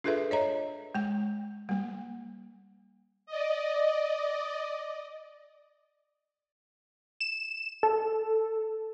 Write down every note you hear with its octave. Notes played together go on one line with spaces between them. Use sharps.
D4 F4 G#4 A4 B4 E5
C#5 D#5 A#5
G#3 G5
G3 A#3
D5 D#5
E7
A4